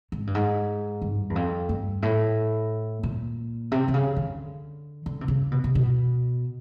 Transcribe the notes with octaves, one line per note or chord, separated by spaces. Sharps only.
G#2
G2
G#2
G2
E2
F2
G2
A2
A#2
C3
C3
C#3
D3
D3
C3
C#3
B2
C3
B2